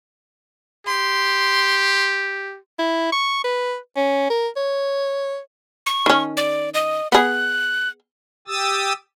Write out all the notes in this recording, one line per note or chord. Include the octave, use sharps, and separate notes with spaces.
G4 C6
E4
C#6
B4
C#4
A#4
C#5
C#6
D#3 C#4
D5
D#5
B3 G#4 F#6
G4 D#6 E6 A6